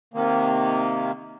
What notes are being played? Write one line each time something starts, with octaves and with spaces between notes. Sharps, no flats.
C3 D#3 A#3